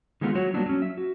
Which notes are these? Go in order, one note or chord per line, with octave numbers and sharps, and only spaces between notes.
D#3 G#3 A3 B3 E4 F4
F#3 F#4 C#5
F#3 G3 A#3 B3 D4 E4
F#3 C#4
E5
F#4